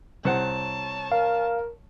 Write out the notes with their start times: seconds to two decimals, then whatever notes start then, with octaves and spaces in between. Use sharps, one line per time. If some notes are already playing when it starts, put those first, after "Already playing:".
0.25 C2 C4 C#5 F#5 A5
1.12 A#4 F5